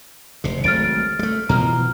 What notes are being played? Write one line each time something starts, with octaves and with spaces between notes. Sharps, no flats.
F1 C3
G#1 F#3 A3 F6 A6 D7
G3 A3
B2 E3 F3 A#5 F6